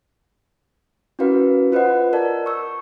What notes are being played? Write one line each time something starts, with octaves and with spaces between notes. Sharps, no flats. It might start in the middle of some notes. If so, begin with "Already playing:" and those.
C#4 E4 F#4 A#4 B4 F5
F4 B4 C5 D#5 F#5
A#4 D5 A5
C#6 E6 G6